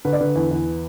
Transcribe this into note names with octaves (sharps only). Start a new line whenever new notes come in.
D3 B4
D5
D3 B4
E2
E2